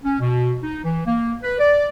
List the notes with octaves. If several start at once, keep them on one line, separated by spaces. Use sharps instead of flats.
C#4
B2
D#4
E3
A#3
B4
D5